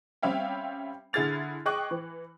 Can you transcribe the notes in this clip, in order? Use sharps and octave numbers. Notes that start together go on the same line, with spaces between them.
G3 C4 C#4 E5 F5 G5
D3 E4 G#4 F6 A6 F7
G#4 D#5 G5 C#6 D6 F#6
E3